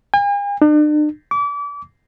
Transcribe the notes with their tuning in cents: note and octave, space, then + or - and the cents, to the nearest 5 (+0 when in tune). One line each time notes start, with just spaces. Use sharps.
G#5 -45
D4 +45
D6 -35